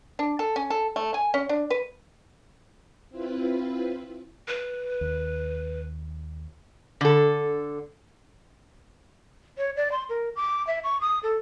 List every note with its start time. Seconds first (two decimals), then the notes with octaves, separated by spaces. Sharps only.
0.19 D4
0.39 A4
0.56 C#4
0.70 A4
0.96 A3
1.14 G#5
1.34 C#4
1.49 D4
1.70 B4
3.10 C4 E4 F4 B4
4.48 B4
5.01 D#2
7.01 D3 A4
9.58 C#5
9.76 D5
9.92 C6
10.09 A#4
10.36 D6
10.67 E5
10.84 C#6
11.01 D#6
11.23 A4